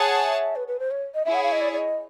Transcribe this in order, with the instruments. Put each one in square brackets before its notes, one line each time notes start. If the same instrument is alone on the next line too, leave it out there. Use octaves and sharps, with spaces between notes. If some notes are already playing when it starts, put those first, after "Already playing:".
Already playing: [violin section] G#4 C#5 F#5 A5
[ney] E5
B4
B4
C5
C#5
D#5
[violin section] E4 G#4 C#5 [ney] E5
[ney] F#5
F5
D#5
D5
D5
D#5